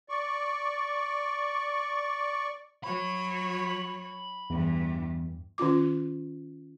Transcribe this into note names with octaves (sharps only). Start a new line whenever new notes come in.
D5 C#6
F#3 C#5 B5
E2 G2 E3
D#3 C#4 F4 D6